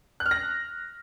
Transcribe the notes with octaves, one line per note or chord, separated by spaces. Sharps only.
F#6
F6
A#6